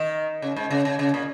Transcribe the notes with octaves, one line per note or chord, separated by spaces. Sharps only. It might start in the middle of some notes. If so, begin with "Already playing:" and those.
Already playing: D#3
C#3
G#2
C#3
C#3
C#3
A#2